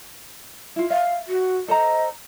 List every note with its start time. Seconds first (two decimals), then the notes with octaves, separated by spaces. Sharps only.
0.76 E4 F4
0.90 E5 F5
1.28 F#4
1.68 A4 C5 D#5 A#5